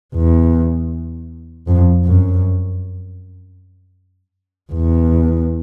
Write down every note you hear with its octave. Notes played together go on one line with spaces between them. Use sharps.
E2
F2
F#2
E2